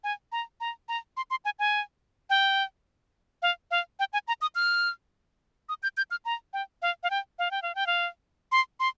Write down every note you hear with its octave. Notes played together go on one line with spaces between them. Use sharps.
G#5
A#5
A#5
A#5
C6
C6
G#5
G#5
G5
F5
F5
G5
G#5
A#5
D#6
F6
D#6
G6
G6
F6
A#5
G5
F5
F5
G5
F5
G5
F5
G5
F5
C6
C6